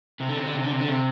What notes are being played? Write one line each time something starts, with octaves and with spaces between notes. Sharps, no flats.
C3
D3
C3
D3
C3
D3
C3
D3
C3